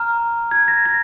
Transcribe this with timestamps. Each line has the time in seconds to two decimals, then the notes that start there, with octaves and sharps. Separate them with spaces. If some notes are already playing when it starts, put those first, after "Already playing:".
Already playing: A#5 F6
0.51 G#6
0.68 A#6
0.86 A#6